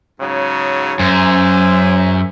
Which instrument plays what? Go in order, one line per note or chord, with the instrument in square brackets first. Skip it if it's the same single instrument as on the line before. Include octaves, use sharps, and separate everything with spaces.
[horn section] G#2 C#3 F#3
[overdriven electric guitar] F#2 [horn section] G#4 C5 E5